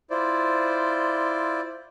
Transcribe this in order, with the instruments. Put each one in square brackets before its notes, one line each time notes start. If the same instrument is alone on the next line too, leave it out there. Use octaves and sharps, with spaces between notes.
[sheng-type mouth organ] E4 F4 C5 D5